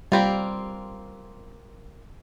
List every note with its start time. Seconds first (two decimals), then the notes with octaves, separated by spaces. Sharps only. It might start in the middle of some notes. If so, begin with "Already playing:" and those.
0.12 G3 A#3 C4 F4 B5